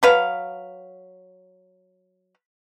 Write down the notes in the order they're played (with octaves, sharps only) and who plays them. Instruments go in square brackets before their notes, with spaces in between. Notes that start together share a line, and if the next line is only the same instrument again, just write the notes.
[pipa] F#3 B4 F5